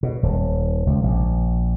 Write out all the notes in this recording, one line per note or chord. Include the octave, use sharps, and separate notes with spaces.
B2
D#1
C#2
A#1